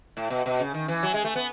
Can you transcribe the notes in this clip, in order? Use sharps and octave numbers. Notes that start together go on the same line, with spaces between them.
A2
B2
B2
C#3
D#3
E3
F#3
G#3
A3
B3